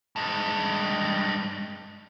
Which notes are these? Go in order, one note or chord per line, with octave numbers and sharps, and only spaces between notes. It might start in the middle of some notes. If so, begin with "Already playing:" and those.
G2 G#3